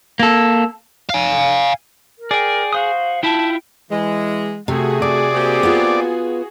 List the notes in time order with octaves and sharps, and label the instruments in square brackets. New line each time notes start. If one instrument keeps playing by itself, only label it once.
[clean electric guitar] A#3 A4
[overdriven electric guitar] F5 G#5
[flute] A#4
[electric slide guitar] G#4 [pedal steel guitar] D5 G5
[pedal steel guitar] F#4 C5 D#6 [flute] F5
[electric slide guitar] E4 F4 [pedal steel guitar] G5 [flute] A5
[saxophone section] E3 G#3
[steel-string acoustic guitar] C3 [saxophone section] A3 [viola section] F#4 G#4
[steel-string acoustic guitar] C3 [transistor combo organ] D5
[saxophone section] A#3 C4 G4
[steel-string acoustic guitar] B3 F4